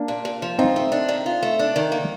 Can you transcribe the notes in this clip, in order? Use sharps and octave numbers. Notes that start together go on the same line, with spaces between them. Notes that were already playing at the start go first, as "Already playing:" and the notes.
Already playing: A#3 D4
A#2
A#2
F3
C4 D#4 F4
A3
D4
D#3
F4
A3
D4
D#3
A#3